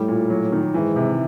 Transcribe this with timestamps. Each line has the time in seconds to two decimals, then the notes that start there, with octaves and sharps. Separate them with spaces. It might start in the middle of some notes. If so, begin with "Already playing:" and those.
Already playing: A2 G3
0.08 A#2
0.30 F#3
0.52 D#3
0.73 G#2 E3
0.96 C3